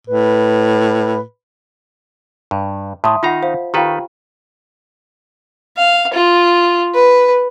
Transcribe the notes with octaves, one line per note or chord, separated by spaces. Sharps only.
A2 B4
G2
A2 E5 A5 C6 D#6
D#3 D#4 F4 F#5 A#5
C5 F5
D#3 F4 G4 A4 B4 F5 G5 A#5
F5
F4
B4